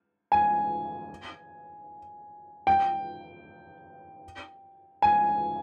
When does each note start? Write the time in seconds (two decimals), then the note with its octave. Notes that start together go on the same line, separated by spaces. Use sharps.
0.32 G#5
2.67 G5
5.02 G#5